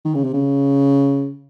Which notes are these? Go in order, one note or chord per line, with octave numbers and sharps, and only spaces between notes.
D#3
C#3
C3
C#3